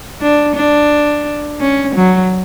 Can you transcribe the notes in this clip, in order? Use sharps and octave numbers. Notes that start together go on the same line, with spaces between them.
D4
D4
C#4
F#3